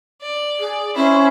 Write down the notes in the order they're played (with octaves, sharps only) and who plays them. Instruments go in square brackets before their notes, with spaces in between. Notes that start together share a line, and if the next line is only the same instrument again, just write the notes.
[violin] D5
[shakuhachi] G#4
[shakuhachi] C#4 [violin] E4 C5